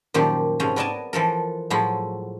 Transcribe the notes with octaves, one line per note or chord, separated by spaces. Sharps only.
F#2 A#2 D#3 F3 G4
G#2 C3 F3 C#4
B3 A#4 D5 D#5 G#5 A5
E3 F3 A4 A#4
A2 F3 F#3 G#3 E4